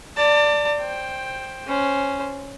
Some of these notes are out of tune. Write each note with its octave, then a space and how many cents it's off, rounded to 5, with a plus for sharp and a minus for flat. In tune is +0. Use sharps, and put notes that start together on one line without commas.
D5 +0 A5 +35
C5 +15 G5 +0
C#4 +0 C5 -5